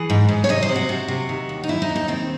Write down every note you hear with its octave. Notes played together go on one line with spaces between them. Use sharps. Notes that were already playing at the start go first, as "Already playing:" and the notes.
Already playing: E3 G#4
G#2
G#2
C#5
C3 D#5
C5
C3
F#4
C3
C3
D#3
D#2
D#4
D#2 E4
D#4
D#2
D#4
D#3 C4